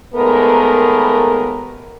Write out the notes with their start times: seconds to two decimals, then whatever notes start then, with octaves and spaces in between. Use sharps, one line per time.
0.15 D#2 G#3 A3 B3 A#4